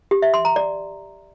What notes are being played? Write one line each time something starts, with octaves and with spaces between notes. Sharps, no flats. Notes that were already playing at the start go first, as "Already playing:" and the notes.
G4
E5
C6
A#5
D5